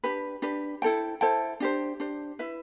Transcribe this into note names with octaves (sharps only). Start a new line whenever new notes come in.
D4 G4 B4
D4 G4 B4
E4 A4 C5 G5
E4 A4 C5 G5
D4 G4 C5
D4 G4 C5
E4 B4 E5